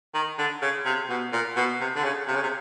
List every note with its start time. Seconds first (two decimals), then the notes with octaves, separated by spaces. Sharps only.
0.14 D#3
0.38 D3
0.62 C#3
0.85 C3
1.09 B2
1.33 A#2
1.56 B2
1.80 C3
1.96 D3
2.04 C#3
2.28 C3
2.35 C#3
2.43 C3